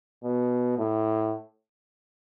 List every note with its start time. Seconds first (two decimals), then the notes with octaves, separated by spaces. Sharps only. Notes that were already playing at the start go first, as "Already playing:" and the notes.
0.24 B2
0.78 A2